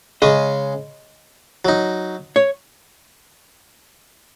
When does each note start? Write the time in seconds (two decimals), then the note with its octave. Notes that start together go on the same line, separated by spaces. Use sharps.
0.22 C#3 G#3 C#4 D#5
1.65 F#3 D#4
2.36 C#5